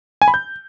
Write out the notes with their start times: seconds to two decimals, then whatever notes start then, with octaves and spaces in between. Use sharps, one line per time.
0.22 G#5
0.28 B5
0.34 G6